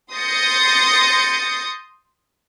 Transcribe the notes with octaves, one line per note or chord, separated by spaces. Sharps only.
C6 D#6 G6 A6 A#6 C#7